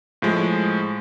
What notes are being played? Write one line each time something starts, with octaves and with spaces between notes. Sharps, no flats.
A2 F3 G#3